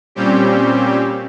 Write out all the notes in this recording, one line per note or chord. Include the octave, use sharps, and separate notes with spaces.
A#2 G3 C4 C#4 G4